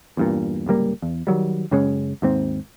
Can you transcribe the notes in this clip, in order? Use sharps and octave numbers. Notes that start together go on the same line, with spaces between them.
E2 G2 A#2
D1 C#2 G3 A#3
E2
D#3 F#3 G3
F#2 C#3 G#3 C#4
D#2 G#2 C4